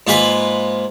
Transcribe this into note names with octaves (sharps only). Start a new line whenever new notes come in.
G#2 A#3 F4 B4 G#5 B5